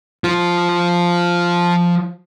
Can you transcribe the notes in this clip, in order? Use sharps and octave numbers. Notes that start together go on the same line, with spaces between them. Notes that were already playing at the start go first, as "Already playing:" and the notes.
F3 F4